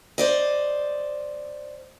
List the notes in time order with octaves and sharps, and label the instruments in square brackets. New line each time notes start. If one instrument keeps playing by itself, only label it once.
[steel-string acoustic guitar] C5 D5 D#5